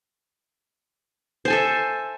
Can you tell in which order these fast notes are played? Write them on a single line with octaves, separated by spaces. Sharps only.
C5 G#5 A4 E5